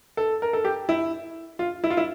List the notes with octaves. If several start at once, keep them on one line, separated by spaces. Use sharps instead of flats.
A4
A#4
A4
G4
E4
F4
E4
F4
E4